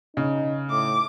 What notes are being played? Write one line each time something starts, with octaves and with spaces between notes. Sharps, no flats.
C#3 D#4
A2 D6